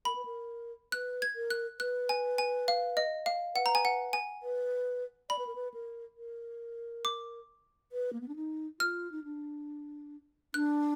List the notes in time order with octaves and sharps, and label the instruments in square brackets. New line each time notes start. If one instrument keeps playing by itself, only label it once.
[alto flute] A#4 [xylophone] B5
[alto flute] B4
A#4
[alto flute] B4 [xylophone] F#6
[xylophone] G#6
[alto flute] A#4
[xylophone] F#6
[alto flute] B4 [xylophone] F#6
[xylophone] G#5
G#5
F5
D#5
F5
[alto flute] B4 [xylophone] F#5
[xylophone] A#5
G#5
F#5
G#5
[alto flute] B4
[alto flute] D5 [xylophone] B5
[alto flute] B4
A#4
B4
A#4
A#4
[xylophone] D6
[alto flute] B4
A#3
B3
D4
D#4
[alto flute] F4 [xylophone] F6
[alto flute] D#4
D4
[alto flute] D4 [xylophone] F#6